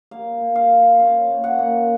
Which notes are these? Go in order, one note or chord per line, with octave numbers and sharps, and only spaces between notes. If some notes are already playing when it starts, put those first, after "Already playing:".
A#3 F5
A#2
F5
F3
C#4 F5
A#2
F#5
A#2